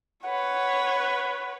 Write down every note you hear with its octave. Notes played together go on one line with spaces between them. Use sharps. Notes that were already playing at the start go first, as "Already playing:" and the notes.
B4 C#5 F#5